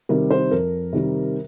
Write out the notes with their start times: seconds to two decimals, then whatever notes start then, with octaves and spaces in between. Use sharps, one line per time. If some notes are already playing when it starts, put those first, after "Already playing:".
0.09 C3 D#3 G3 A#4
0.31 C5
0.51 F2 A#4
0.93 C3 D#3 G3